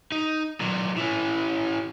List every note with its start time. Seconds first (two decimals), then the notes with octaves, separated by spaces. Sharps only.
0.12 D#4
0.61 A#2 F#3
0.97 E3 C#4